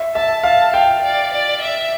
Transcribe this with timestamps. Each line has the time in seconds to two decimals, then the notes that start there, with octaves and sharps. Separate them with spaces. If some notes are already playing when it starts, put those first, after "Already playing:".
Already playing: E5
0.15 E5 A5
0.43 F5 A5
0.73 F5 G5
1.03 D5
1.32 D5
1.61 E5